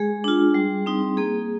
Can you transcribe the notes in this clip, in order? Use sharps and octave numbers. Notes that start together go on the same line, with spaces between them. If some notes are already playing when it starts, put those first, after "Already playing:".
Already playing: G#3 G#4
D4 F4
G3
C4 D#4
A#3 G#4